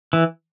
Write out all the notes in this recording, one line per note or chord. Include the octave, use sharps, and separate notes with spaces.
E3